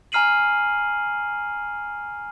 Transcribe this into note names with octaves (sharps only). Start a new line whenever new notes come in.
G#5 A#5 F6 C7 D#7 F#7